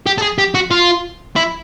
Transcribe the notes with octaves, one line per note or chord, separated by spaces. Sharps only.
G4
A4
G#4
G4
F#4
F4
E4